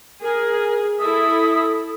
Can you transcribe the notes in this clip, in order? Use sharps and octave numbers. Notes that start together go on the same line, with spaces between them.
G#4 A#4
E4 A4 E5 D#6